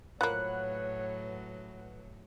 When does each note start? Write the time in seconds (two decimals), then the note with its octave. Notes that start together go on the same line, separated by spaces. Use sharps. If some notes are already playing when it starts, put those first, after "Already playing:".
0.21 A2 F3 F#3 A#3 B4 C#5 F#5 F#6